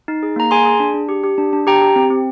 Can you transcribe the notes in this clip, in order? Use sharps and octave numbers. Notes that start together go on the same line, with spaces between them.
D#4
G#4
A#3 A#5
G#4 G#5 C6
G#4
D4
D4
G4
G4
D4
D4
G4 G5 A#5
G4
C4
C4